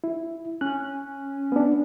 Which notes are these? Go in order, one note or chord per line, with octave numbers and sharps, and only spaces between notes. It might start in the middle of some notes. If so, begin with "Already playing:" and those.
E4
C#4 F#6
B3 D4